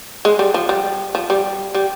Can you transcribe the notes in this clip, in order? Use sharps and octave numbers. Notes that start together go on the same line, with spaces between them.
G#3
G3
F3
G3
F3
G3
G3